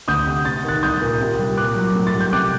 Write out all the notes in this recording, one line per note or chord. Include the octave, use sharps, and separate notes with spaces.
D2 D#6 G6
C3
C3 A6
D#3 F#6 A6
C2 D#6 G6
A#2
C3
G3
A#2 D6 F#6
F#3
A2
A6
G3
G6
C3 D6 F#6